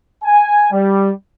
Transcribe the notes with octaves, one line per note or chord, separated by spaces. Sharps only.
G#5
G3